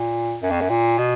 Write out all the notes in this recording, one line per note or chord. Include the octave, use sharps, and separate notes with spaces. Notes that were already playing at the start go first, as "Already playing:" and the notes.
Already playing: A#2
F#2
F2
F#2
A#2
B2